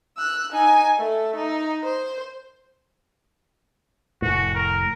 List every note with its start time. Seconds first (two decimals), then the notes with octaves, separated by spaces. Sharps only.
0.18 E6 F#6
0.52 D#4 G#5
0.98 A3 A4
1.36 D#4
1.84 C5
4.22 F1 A2 F#4
4.55 A#4